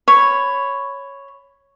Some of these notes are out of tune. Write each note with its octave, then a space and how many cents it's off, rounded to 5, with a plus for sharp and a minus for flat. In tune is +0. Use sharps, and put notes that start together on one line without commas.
C#5 +0 B5 +15